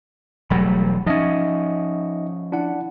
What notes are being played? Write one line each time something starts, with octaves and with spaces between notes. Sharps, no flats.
E1 F#3 G3 A3 B5
F3 C#4 D#4 D#5 E5
D4 E4 F#5